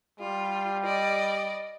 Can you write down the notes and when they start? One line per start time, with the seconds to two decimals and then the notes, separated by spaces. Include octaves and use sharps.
0.20 G3 F4
0.84 D5 D#5